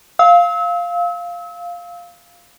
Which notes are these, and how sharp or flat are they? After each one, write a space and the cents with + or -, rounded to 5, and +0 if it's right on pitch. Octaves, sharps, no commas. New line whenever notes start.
F5 +0 E6 -35